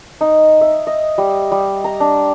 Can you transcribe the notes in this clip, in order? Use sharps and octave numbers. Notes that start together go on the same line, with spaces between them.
D#4
E5
D#5
G3
G3
A#5
D4